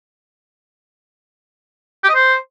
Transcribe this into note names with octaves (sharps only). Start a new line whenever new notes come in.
G4
D#5
C5